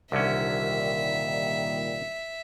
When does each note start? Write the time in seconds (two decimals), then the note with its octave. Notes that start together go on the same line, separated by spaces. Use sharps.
0.12 C2 A#2 D3 D#3 G3 C#4 E5